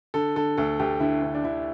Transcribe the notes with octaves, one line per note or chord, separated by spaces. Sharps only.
D3 A4
D3 A4
D2 A4
D2 G4
D3 E4
D2
D4
D3 E4